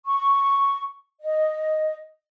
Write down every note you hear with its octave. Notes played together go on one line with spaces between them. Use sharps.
C#6
D#5